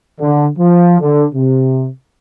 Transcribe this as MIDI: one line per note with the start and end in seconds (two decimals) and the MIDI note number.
0.19 0.45 50
0.58 0.96 53
1.00 1.24 50
1.34 1.86 48